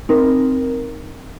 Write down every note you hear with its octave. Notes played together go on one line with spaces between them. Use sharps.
C4 D#4 A#4